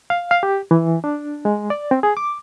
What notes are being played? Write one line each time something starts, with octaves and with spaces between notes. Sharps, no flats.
F5
F5
G4
E3
D4
G#3
D5
C4
G#4
D6